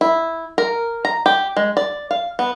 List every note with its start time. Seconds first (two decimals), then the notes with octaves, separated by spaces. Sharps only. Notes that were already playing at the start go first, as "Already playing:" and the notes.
0.01 E4
0.58 A#4
1.05 A#5
1.26 G4
1.57 G#3
1.77 D5
2.11 F5
2.39 B3